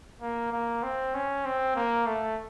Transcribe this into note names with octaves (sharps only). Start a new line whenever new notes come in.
A#3
A#3
C4
C#4
C4
A#3
A3